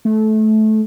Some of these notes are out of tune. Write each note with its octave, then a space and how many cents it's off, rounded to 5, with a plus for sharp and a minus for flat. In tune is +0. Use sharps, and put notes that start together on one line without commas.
A3 -20